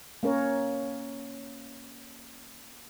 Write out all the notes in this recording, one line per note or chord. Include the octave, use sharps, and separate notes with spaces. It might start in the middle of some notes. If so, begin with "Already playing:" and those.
A#3 C#4 A#4 C#5